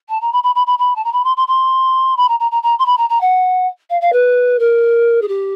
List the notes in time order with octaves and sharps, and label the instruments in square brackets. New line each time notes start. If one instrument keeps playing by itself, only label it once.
[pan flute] A5
A#5
B5
B5
B5
B5
B5
A5
A#5
B5
C6
C6
C6
B5
A#5
A#5
A#5
A#5
C6
B5
A#5
A#5
F#5
F5
F5
B4
A#4
G#4
G4